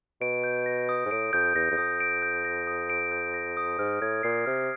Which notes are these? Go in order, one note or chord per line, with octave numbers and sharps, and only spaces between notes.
B2 D7
G6
A#6
D#6
G#2
A2 D7
F2 G6
E2 A#6
E2
F2 D#6
D7
G6
A#6
D#6
D7
G6
A#6
D#6
G#2 F6
A2 G#6
A#2 C7
C3 F6